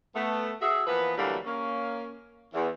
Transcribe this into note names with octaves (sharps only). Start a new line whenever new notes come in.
A3 B3
F#4 G#4 E5
E3 F3 A#3 B3 B4
D2 E3 F#3 G3 A3 A#3
A#3 C#4
E2